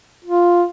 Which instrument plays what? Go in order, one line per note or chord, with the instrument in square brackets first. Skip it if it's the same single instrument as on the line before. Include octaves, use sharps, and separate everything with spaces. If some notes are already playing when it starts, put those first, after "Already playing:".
[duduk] F4